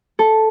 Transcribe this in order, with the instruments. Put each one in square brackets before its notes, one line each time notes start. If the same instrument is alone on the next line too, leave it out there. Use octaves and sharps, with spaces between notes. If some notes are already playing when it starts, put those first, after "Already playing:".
[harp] A4